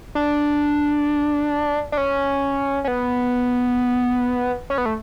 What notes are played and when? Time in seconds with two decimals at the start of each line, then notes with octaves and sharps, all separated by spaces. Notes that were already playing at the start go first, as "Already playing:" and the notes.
0.15 D4
1.92 D4
1.97 C#4
2.84 C#4
2.88 B3
4.70 C#4
4.78 B3
4.86 A3